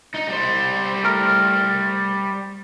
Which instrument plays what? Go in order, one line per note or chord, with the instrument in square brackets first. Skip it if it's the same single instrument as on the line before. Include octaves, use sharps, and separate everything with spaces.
[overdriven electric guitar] D#4 D#5
G3 C5
[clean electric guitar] A3 A#4